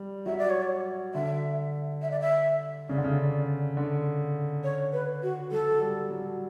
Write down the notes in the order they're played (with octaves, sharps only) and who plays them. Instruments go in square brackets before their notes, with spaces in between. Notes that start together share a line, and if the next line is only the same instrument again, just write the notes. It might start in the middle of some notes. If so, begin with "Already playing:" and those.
Already playing: [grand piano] G3
[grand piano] F#3 [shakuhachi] E5
[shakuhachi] D5
C#5
D5
[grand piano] D3 [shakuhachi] E5
[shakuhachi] E5
D5
E5
[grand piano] C#3 [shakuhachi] D5
[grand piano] D3
C#3
D3
[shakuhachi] C#5
B4
F#4
[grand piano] F#3 [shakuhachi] A4
[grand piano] G3
F#3